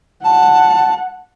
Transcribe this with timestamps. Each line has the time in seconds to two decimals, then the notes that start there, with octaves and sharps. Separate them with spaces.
0.24 F#5 A5